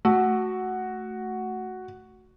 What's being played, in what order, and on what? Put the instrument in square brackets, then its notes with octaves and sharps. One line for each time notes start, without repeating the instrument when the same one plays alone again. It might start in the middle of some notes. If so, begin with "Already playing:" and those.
[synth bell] A3 [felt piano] F#4